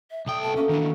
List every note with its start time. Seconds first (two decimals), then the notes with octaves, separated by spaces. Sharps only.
0.11 E5
0.26 C2 A4 D5 E5 G5 D#6
0.42 B2 A3 A5
0.56 A3 A#3 C#4 F#4
0.69 D#3 E3 D4